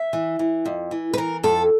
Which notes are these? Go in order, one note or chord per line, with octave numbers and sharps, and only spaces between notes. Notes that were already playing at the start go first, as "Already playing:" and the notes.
Already playing: E5
E3
E3
F2
E3
B4
E3 A#4
F2 A4